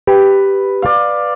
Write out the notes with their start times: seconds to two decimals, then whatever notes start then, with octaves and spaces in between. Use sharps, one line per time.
0.07 G4 B4
0.82 D5 F5